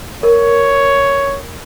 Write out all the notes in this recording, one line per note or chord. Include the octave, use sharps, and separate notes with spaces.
A#4 C#5